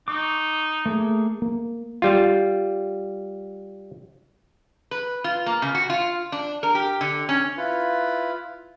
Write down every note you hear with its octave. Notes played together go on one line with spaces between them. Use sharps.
D#4 C#6 D6
A3 A#3 G#4
A#3
G3 F4
B4
F4
A#3
C#3
F#4
F4
D4
A#4
G4
D3
C#4
E4 F4 B4